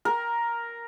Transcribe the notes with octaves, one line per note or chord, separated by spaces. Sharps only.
A#4